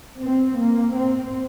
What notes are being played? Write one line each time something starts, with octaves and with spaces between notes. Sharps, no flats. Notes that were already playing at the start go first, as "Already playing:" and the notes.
C4
A#3
C4